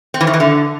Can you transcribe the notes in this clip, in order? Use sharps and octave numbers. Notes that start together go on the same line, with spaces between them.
C4
E3
D#3
E3
D3